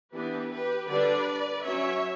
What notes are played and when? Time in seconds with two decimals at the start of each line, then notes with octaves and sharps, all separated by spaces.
0.13 E3 B3 D4 G4 B4
0.50 G4 B4
0.88 D3 G3 D4 B4 D5
1.64 F#3 C#4 C#5 E5